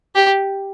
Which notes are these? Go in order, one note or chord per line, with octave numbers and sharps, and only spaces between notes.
G4